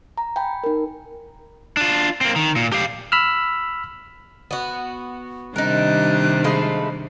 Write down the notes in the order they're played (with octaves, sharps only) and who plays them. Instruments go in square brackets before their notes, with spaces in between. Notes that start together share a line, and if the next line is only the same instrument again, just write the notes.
[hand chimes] A#5
G5 G#5 B5
D#4 A#4
[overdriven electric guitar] D4 F4
A#3 C4
D#3
A#2
G4 F5
[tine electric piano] B5 E6 F6
[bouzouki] B3 F#4
[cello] C3 D#3 [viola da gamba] G3 D4 [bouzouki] D#4 A#4 [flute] F#6
[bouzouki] G#3 A3 F5 [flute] B5